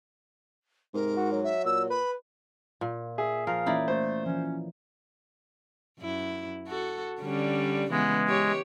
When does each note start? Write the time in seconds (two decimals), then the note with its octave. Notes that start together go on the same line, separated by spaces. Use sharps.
0.94 G#2 C3 A#4
1.17 F#4
1.32 F#3
1.43 E5
1.65 A#2 E6
1.90 B4 B5
2.81 A#2
3.18 G#4 E5
3.47 F3 A#4 F5
3.66 E3 A#3 C#4 D#4 E4 D5
3.88 A3 C5
4.26 E3 F3 C#4
5.99 F#2 E4
6.68 F#4 A4
7.21 D3 G3 C#4
7.91 C#3 E3 G#3 B3
8.27 G4 C#5